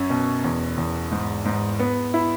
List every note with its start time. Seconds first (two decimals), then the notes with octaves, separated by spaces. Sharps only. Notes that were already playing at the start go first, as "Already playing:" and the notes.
Already playing: F#2 C#4
0.10 B2
0.44 E2
0.77 E2
1.12 G#2
1.45 G#2
1.79 B3
2.14 E4